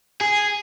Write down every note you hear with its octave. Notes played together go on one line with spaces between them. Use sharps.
G#4